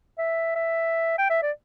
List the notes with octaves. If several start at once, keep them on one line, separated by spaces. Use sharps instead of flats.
E5
E5
G5
E5
D5